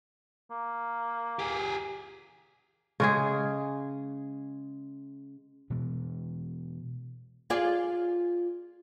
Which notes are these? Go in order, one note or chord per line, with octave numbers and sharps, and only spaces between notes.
A#3
G4 G#4
C#3 G#3 G#4
B2 E3 G#3
F4 G#4 D5